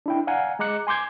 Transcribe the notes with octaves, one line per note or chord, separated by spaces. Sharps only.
D4 E4 G5
D5 F5 F#5 G#5 A#5
G#3 D#5 A#5 D6 F#6 C#7
G#5 C6 D6 G6 G#6